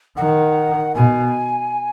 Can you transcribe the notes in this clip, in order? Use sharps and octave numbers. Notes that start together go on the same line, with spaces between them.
D#3 F#5
B2 G#5